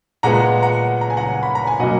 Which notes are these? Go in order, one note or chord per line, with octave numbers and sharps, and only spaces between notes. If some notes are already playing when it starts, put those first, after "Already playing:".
A#2 G#3 B3 F#5 A#5
F#5 A#5
A#5
G#5
F#5 A#5
B5
A#5
G#5
B2 F#3 A#3 D#5 F#5